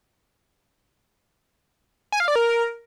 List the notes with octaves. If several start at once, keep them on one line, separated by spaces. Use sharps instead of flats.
G#5
F5
D5
A#4